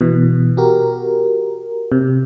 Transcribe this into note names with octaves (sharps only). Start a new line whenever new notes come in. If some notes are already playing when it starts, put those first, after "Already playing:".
B2 E3
F#4 G4 A#4
C3